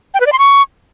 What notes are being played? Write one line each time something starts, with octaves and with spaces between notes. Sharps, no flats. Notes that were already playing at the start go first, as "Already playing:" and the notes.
G5
B4
D5
C6
C#6